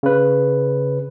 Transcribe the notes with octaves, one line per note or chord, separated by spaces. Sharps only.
C#3 B4